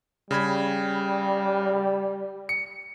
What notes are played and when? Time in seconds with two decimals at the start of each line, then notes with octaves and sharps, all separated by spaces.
0.31 C#3 G3 B5 G#6
2.49 C#7